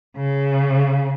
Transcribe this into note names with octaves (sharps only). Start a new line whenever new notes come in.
C#3